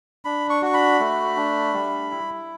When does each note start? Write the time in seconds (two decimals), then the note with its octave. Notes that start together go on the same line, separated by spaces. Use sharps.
0.25 D4 B5
0.50 C#6
0.62 F#4 C#6
0.74 B5
1.00 A3
1.36 D4
1.73 G3
2.11 E4